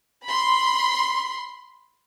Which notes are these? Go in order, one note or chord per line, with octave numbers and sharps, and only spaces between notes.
B5 C6